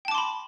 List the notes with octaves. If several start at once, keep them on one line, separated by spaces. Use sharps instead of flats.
G5 A5 B5 C6 D6